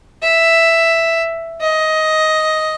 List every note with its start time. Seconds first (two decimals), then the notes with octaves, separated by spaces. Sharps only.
0.22 E5
1.61 D#5